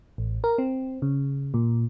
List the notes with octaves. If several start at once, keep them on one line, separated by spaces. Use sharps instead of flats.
A1
A#4
C4
C#3
A#2